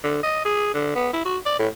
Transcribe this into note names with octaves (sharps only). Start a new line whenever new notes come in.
D3
D#5
G#4
D3
B3
E4
F#4
D5
A2